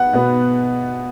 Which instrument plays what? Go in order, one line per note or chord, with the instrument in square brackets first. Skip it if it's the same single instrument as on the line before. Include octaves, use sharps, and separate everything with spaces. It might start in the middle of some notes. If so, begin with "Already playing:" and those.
Already playing: [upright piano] B3 F#5
B2 B3